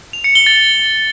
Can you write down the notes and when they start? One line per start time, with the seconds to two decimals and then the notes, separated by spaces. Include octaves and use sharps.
0.13 F7
0.24 C#7
0.35 G7
0.46 A6